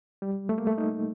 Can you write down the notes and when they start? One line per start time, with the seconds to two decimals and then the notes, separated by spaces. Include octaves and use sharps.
0.22 G3
0.49 A3
0.58 A#3
0.67 A3
0.78 D#4